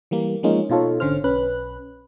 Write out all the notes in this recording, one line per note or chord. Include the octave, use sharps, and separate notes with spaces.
E3 G3 A#3
F3 G#3 A#3 C#4 D#4 F4
B2 D#4 F4 A4 C#5
G#1 D3 C#4 C5 F6
B1 C#4 B4 F#6